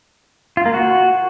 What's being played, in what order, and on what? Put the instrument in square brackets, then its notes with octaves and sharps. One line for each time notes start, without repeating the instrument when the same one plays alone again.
[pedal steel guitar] F4
A#3
F#4